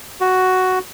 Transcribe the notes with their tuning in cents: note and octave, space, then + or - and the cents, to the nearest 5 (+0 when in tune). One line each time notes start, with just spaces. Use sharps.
F#4 +5